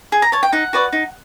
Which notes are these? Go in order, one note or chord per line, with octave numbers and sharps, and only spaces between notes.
G#4
A#5
C#5 A5
G5
D#4 F#5
F#4 B4 D5
D#4